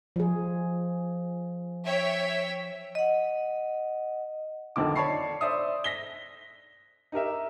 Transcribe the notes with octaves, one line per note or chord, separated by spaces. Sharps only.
F3 G#4
C#5 E5 G5
D#5 F#5
B1 F2 D3 D#3 D6
C#5 D5 A5 B5 C#6 C7
C5 D5 E5 D#6
A#6 B6 G7
D#4 G4 A#4 E5